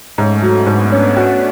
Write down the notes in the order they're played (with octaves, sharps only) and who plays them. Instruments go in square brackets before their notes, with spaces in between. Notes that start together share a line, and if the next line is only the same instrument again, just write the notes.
[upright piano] G#2 [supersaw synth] A3 C#4
[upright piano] F#3
[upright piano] G#2 [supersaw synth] B3 D4
[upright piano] C#4
F#4